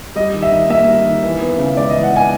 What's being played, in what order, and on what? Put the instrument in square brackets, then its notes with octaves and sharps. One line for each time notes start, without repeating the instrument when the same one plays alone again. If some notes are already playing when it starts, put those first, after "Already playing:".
[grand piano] G3 D#5
D#3
E5
D#3
A#3 E5
G3
D#3
E3
B3
C#3
G#3 D5
E3 D#5
F#5
B3 G#5